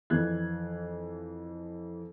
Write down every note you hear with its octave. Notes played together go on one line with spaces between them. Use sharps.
F2 E3 F#6 G#6